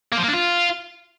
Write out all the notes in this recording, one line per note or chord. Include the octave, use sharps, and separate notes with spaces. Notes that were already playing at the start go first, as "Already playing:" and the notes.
A#3
F3
A#3
D4
F4